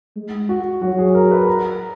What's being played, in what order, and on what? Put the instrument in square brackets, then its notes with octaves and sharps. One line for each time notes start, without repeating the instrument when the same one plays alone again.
[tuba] G#3
[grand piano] F#4
[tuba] F#3 [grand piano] F#4
[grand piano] G#4
A#4
B4
A#5